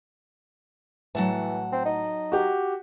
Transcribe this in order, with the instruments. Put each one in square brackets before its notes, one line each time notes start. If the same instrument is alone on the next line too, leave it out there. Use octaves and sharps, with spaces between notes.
[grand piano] A2 [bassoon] E3 [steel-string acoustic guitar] F#3 F#5 A5
[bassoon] C4
D#4
[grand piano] F#4 G4